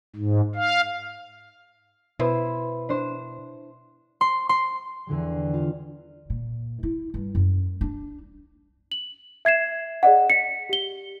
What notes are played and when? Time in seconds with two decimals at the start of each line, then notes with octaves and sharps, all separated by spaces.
0.16 G#2
0.55 F5
2.19 B2 E4 B4 C5
2.89 D4 C5
4.21 C6
4.49 C6
5.07 E2 D3 G3
5.54 F4
6.30 A#2
6.83 E4
7.14 G2
7.35 F#2
7.81 D4
8.92 F#7
9.45 E5 G#6 C7 E7
10.03 G#4 D5 D#5 F#5
10.30 B6 C#7
10.69 G4 G7